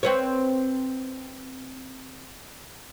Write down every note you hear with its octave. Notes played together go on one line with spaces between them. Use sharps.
C4 B4 C#5